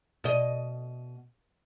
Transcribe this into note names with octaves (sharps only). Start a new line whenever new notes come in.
B2 D#5